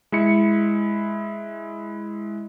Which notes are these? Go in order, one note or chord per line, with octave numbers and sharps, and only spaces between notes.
G#3 E4 C#7